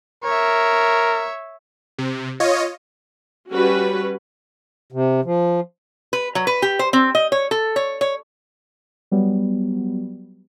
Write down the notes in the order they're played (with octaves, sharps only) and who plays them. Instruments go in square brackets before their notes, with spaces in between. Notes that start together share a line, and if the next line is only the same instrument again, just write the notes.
[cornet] A#4 [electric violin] C#5 E5
[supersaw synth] C3
F4 C#5 D#5
[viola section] G3 C#4 F#4 B4
[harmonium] C3
F3
[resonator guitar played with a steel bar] B4
F#3
B4
G4
C5
C4
D#5
C#5
A4
C#5
C#5
[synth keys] F#3 G3 B3